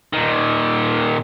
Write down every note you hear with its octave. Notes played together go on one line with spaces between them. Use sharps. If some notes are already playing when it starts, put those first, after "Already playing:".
A#2 D#3